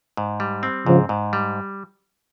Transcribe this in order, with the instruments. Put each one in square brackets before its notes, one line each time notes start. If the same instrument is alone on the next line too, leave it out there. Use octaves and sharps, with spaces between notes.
[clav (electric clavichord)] G#2
G3
C4
[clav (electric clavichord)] G#2 [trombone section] C#3 F3
[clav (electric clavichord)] G#2
G3